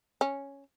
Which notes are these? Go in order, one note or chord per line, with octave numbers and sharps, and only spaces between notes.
C#4